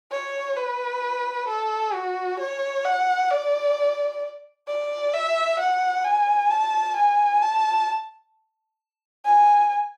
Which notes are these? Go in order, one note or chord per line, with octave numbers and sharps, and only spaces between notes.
C#5
B4
A4
F#4
C#5
F#5
D5
D5
E5
F#5
G#5
A5
G#5
A5
G#5